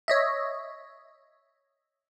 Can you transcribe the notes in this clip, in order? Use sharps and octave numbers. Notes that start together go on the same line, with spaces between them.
C#5 D#5 E5